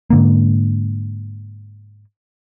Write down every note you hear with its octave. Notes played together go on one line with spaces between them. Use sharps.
G#2 D3 A#3